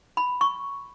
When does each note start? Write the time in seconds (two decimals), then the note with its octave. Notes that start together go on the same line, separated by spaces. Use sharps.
0.17 B5
0.41 C#6